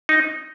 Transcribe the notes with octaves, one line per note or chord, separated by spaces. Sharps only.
D#4